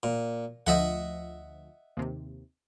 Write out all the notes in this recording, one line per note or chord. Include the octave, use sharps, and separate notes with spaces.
A#2
D2 F3 D#5 E5 F#5
D#2 C3